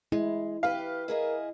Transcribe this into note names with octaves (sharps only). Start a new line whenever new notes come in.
G#3 E4
G4 B4 F5
E4 G#4 A#4 D#5